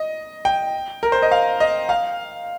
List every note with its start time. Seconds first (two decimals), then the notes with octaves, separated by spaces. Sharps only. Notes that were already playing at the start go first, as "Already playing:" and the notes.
Already playing: D#5
0.45 G5
1.03 A#4
1.12 C5
1.22 D#5
1.32 F5
1.60 D#5
1.89 F5